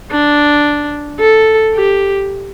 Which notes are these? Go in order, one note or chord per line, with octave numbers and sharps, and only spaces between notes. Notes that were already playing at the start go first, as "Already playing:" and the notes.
D4
A4
G4